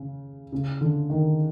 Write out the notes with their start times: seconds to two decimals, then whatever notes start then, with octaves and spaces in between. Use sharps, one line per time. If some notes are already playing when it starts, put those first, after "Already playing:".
Already playing: C#3
0.52 C#3
0.81 D3
1.10 D#3